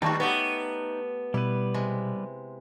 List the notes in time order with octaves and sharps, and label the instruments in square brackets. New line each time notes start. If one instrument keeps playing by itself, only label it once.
[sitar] D#2 [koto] G3 A3 F#4 [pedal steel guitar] D#4
[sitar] B3 [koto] G4 A4 C#5
[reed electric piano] B2 [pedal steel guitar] G3 B4 [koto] E4
[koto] C3 G#3